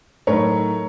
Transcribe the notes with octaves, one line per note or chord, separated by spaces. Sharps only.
A2 F#3 A3 D#4 A#4 C#5